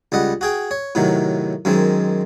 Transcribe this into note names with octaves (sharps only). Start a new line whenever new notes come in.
C#2 G3 D#5 F#5
F#4 G#4 G5
C#5
A2 C3 D#3 F#3
F#2 D#3 G#3 C4